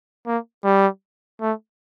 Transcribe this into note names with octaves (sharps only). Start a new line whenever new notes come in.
A#3
G3
A3